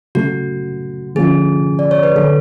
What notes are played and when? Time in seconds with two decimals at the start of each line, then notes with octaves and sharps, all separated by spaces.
0.15 C#3 F#3 A3 F#4
1.15 D3 F3 A3 C#4 F4 G#4
1.79 D5
1.91 C#5
2.03 B4
2.16 D3 F#3 A4